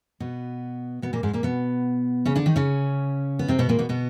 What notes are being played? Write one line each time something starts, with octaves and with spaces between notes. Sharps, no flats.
B2 B3
B2 B3
A#2 A#3
G#2 G#3
A#2 A#3
B2 B3
C#3 C#4
D3 D4
D#3 D#4
C#3 C#4
B3
C3 C4
B2 B3
A#2 A#3
B2 B3
B2 B3